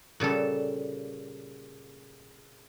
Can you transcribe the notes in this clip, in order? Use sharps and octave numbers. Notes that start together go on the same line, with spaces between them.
A#2 C#3 G3 A4